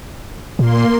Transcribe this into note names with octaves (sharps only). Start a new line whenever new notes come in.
A#2 A#3 C6